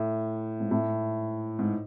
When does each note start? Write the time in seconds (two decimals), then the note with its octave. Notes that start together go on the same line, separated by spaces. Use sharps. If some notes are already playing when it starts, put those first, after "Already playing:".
Already playing: A2
0.60 G#2
0.71 A2
1.59 G#2